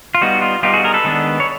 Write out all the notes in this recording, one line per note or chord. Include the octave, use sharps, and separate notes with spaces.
F4
G3 B3 D#4 F#4
F4
G3 B3 D#4 F4 G4
F#4 G#4
G#4 A#4
A4 B4
D#3 G#3 B3 D4
C#5